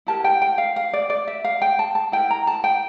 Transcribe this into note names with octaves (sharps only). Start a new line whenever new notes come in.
E4 G4 A#4 A5
G5
G5
F5
F5
D5
D5
E5
F5
G5
A5
A5
E4 A#4 G5
A#5
A5
G5